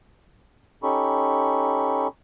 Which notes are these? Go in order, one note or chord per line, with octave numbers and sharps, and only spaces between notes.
C#4 D#4 G4 A4 B5 C#6